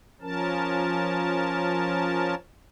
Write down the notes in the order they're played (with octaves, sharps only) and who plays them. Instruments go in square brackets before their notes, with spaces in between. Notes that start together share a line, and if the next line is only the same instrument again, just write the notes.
[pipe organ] F3 C#4 A#4 A5